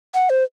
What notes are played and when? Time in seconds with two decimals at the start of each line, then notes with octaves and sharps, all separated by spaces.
0.14 F#5
0.30 C5